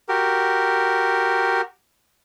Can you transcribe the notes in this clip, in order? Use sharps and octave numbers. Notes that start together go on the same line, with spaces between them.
F#4 G4 A#4